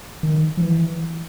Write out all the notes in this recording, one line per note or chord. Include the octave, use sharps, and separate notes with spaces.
D#3
F3
E3